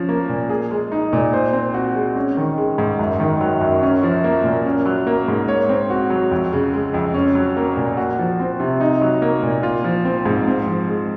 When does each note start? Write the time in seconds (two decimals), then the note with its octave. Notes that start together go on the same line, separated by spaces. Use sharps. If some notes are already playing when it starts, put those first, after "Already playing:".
Already playing: F3 C#4
0.09 A#3
0.29 A#2
0.49 G#4
0.71 G#3
0.92 D#4
1.13 A#2
1.33 C5
1.53 C4
1.74 F#4
1.95 G#3
2.16 C#4
2.37 D#3
2.58 G#3
2.78 G#2
2.99 F#2
3.19 D#3
3.41 F#3
3.61 F#2
3.83 C#4
4.03 F3
4.24 A#3
4.44 A#2
4.66 C#4
4.86 F#3
5.07 A#3
5.28 G#2
5.48 C#5
5.69 C4
5.90 F#4
6.10 F#3
6.31 F2
6.53 C#3
6.74 G#3
6.94 F2
7.14 C#4
7.35 F#3
7.57 A#3
7.77 A#2
7.97 F#4
8.19 F3
8.40 C4
8.60 C3
8.80 D#4
9.01 F#3
9.22 A#3
9.43 A#2
9.63 F4
9.84 F3
10.05 C4
10.25 G#2
10.47 C4
10.67 F3
10.88 G#3